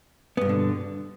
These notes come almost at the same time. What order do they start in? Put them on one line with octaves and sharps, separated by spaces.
B3 G2 B2 D3